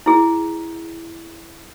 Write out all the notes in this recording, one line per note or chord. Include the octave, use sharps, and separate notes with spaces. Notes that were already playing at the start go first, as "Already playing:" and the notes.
E4 G#4